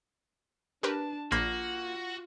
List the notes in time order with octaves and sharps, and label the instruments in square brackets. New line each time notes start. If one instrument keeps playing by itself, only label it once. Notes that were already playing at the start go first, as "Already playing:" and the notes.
[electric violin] D4 A5 [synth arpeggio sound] G4 A#4 B4
[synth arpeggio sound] A#1 B5 G6 [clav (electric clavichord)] A#3 [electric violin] F4 [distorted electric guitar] F#4